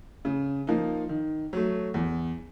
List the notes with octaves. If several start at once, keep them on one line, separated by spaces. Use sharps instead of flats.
C#3
F3 A#3 D#4
D#3
F#3 A3
E2